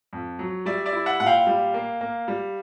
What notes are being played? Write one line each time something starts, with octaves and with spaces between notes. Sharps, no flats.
F2
F#3
G3 D5 E5
D5 E5
E4
E5 F#5
A#2 F#5
F5 G5
G3
A#3
A#3
G3